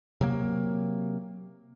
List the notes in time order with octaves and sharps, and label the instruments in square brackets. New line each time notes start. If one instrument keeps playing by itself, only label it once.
[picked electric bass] C3 F#3 A#3